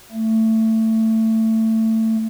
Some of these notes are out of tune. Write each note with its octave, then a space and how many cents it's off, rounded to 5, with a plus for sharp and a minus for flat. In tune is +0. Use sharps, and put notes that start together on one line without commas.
A3 +20